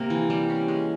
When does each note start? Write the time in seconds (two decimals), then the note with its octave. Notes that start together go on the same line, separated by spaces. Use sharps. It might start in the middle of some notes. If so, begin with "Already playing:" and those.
Already playing: C3 A#3
0.10 E3
0.30 G3
0.50 C#4
0.68 G#3